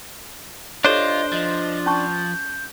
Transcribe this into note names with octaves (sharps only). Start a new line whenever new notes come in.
D4 F4 G4 A4 C5 C#5 D#5
F3 D#5
C#4 A5 C#6 G6